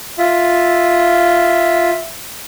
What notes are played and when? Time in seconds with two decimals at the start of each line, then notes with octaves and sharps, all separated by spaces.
0.18 F4 E5